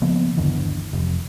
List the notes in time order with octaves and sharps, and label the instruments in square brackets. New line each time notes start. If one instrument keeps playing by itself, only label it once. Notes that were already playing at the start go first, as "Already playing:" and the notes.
[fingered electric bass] C#3 F3 A#3 B3
G1 D#2 D3 E3
F1